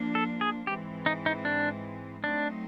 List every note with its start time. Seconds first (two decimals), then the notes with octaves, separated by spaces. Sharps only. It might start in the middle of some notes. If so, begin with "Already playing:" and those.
Already playing: F3 A#3 D4
0.15 A4
0.41 G#4
0.67 G#2 E3 G#3 C4 G4
1.06 D#4
1.26 D#4
1.45 D4
2.24 F#3 A3 C4 D4 D#4